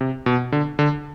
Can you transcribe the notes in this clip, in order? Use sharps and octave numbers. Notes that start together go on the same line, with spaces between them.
C3
B2
D3
D3